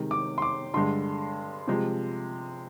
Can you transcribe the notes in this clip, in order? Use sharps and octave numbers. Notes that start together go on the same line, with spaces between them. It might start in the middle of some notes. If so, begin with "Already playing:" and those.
Already playing: C3 D#3 G#3
D6
C6
D6
G2 D3 G#3 C6
C3 F3 G#3